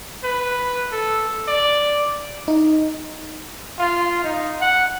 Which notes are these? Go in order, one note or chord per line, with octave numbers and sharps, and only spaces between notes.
B4
A4
D5
D#4
F4
D#4
F#5